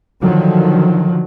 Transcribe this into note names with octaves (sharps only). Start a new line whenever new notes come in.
D3 D#3 F3 F#3